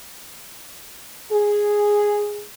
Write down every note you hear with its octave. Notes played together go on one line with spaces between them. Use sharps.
G#4